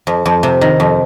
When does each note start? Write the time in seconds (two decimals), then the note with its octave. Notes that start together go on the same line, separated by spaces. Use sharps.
0.07 F2
0.26 F2
0.43 C3
0.61 D#3
0.80 F2